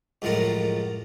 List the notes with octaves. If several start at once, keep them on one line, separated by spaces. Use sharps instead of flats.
C#2 F#2 A2 F3 A#4